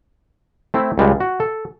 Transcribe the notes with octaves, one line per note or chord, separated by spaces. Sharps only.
A3 C4 E4
C#2 G3 G#3
F#4
A4